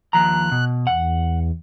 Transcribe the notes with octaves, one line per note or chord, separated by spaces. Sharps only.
D#2 F3 A#5 F#6
B2
E2 F#5